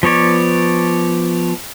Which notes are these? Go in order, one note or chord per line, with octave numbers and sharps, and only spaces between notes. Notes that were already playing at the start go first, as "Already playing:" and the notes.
F3 B3 C#5 D5